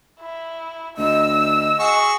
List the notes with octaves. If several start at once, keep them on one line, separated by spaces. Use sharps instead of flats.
E4
D2 D#5 E6
F#4 G#4 C#6